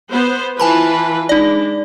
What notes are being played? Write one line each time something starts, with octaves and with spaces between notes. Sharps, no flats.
B3 C5
E3 F4 B4 G#5 A5 B5
G#3 D4 D#4 D5